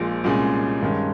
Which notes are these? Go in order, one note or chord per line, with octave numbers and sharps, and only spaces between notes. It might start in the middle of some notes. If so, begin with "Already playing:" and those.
Already playing: A#1 A#2 F3 G#3
C2 A#2 G#3 C#4 G#4
G2 D#3 G#3 C#4